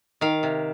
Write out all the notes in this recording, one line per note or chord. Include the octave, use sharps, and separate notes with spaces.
D#3 F5
C3